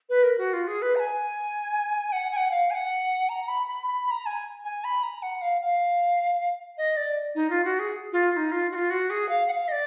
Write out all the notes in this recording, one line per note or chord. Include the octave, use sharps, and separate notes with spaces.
B4
A#4
F#4
F4
G#4
B4
A#5
G#5
F#5
G#5
F#5
F5
G#5
F#5
A#5
B5
B5
B5
B5
A#5
G#5
G#5
B5
A#5
F#5
F5
F5
D#5
D5
D#4
F4
F#4
G#4
F4
F4
D#4
F4
F#4
F4
F#4
G#4
F5
F#5
F5
D#5
D5